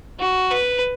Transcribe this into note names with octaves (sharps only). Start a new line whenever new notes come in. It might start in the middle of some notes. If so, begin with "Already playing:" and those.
F#4
B4